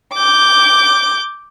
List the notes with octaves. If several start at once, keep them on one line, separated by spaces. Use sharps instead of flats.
D6 G6